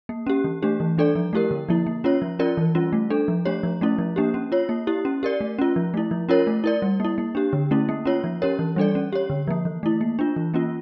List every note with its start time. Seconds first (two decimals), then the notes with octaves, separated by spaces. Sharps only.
0.09 A#3
0.27 C#4 G4
0.44 E3
0.62 A3 D4 G4
0.80 E3
0.98 G3 D4 A4 D5
1.15 F3
1.33 A3 E4 G4 A#4
1.51 D3
1.69 F3 A#3 E4
1.87 A#3
2.04 C#4 F4 C#5
2.22 F3
2.39 C#4 F4 A#4 D5
2.57 E3
2.75 G3 C#4 F4
2.93 A3
3.10 D4 A4
3.28 F3
3.45 A3 D4 G4 C#5
3.63 F3
3.81 A3 C#4 E4
3.98 F3
4.16 A#3 D4 G4
4.34 C#4
4.52 F4 C#5
4.69 A#3
4.87 E4 G4
5.05 C#4
5.23 G4 A#4 D5
5.41 A3
5.59 C#4 F4
5.76 F3
5.94 A3 E4
6.11 F3
6.29 C#4 F4 A#4 C#5
6.47 A3
6.64 E4 A#4 D5
6.82 G3
7.00 A#3 E4
7.18 A#3
7.35 D4 G4
7.53 D3
7.71 A3 C#4 E4
7.89 A#3
8.05 C#4 F4 C#5
8.24 F3
8.42 C#4 G4 A#4 C#5
8.59 E3
8.76 G3 D4 A4 D5
8.95 C#4
9.13 G4 C#5
9.30 D3
9.47 F3 A#3
9.65 E3
9.83 A3 E4
10.01 A#3
10.19 D4 F4
10.36 E3
10.54 A#3 C#4 F4